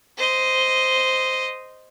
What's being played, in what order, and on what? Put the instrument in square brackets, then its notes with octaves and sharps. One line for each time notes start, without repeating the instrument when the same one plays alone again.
[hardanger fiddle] C5 D#5